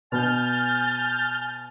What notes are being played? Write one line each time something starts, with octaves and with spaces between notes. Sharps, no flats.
B2 G#5 F6 G6 A6